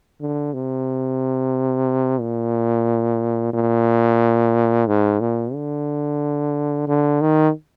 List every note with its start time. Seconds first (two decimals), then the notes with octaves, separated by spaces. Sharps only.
0.21 D3
0.53 C3
2.20 A#2
3.54 A#2
4.87 G#2
5.20 A#2
5.54 D3
6.87 D3
7.21 D#3